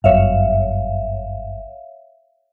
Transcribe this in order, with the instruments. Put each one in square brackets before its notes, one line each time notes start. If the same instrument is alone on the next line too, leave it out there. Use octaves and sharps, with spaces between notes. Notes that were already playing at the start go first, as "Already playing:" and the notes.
[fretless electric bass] G1 F#2 [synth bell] C#5 E5 F5